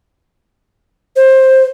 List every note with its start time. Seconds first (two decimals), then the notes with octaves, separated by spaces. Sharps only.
1.16 C5